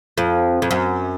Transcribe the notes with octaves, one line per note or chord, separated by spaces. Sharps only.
F2
F2
F#2